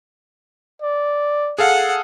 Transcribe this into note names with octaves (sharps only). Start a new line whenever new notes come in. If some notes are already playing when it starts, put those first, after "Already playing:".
D5
G#4 A4 F5 F#5